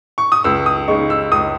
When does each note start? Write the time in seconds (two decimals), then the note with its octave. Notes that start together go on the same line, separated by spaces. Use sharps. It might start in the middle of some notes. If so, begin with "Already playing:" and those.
0.18 C#6
0.32 D#6
0.44 C#2 E6
0.66 D#6
0.88 C#3 G#3 D#4 C#6
1.10 E6
1.31 C#2 D#6